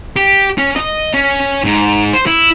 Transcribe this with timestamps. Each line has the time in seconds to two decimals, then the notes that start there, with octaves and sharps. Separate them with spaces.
0.16 G4
0.58 C#4
0.76 D#5
1.13 C#4
1.64 G#2
2.13 C5
2.26 E4